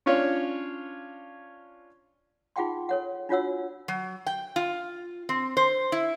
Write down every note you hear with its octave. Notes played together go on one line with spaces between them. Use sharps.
C#4 D4 F4 C#5
D#4 F4 G#4 F#5 G5 C6
A4 C#5 F#5
D4 F4 F#4 C#5 F#5 E6
F#3
G5
F4
C4
C5
E4